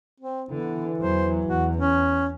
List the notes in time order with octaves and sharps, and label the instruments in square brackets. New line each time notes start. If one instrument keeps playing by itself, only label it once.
[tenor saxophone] C4
[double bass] D3 [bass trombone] E3 [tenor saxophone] B3
[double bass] E2 F#3 [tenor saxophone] C5
[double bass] E2 [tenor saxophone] F#4
[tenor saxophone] C#4